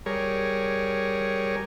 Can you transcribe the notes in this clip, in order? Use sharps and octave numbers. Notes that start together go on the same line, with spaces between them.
G3 G#4 A#4 C#5